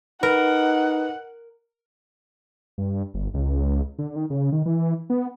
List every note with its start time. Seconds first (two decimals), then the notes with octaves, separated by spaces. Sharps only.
0.23 D#4 A#4 B4 F#5
2.78 G2
3.14 G1
3.34 C#2
3.99 D3
4.16 D#3
4.30 C#3
4.52 D#3
4.66 E3
5.10 B3